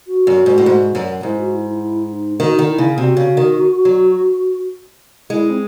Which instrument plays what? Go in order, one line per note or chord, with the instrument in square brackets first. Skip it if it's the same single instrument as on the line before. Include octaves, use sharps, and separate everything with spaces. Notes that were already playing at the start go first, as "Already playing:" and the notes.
[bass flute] F#4
[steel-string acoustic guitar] F#2
G#2
A2
G#2
F#2
[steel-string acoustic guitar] G#2 [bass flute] E4
[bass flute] F#4
E4
E4
E4
D#4
[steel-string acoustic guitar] D#3 [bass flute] F#4
[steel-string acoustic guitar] D#3
[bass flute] E4
[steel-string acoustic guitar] C#3
[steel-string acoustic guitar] C3 [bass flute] F#4
[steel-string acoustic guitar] C#3
D#3
F#3
[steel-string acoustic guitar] G#3 [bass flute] E4
[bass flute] C4